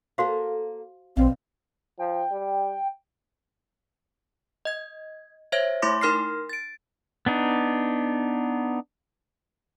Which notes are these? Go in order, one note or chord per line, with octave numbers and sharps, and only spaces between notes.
A#3 F#4 A4 C5 F5
A#1 B2 G3 C4 F5
F3 G5
G3
D#5 G#6
C5 C#5 E5 G#6 A#6
A3 E4 C6 D6 A#6
D#4 A#4 C6 F6 A#6 C7
A6 D7
B3 D4 D#4